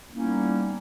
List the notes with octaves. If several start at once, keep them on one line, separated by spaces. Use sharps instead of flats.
G3 A#3 B3 C#4 D#4 E4